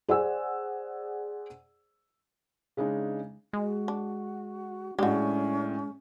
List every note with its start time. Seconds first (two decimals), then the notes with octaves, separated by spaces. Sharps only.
0.08 G#4 C5 D5 F#5 G#5 E6
2.77 C#3 G#3 D4 D#4
3.53 G#3 F#4
3.88 D4
4.99 A2 G#3 C#4 D4 F#4 G4